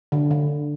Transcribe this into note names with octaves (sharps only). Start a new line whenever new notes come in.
D3
D3